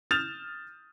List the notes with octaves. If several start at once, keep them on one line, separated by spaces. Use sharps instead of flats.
D#6 F6 G6 A6 E7 F7